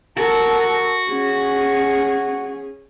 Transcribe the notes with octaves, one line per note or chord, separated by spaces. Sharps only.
F#4 A4 A#4
C#4 G#4